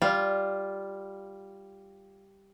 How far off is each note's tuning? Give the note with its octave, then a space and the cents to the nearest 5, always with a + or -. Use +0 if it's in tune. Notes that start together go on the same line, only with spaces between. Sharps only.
G3 +0 F4 +0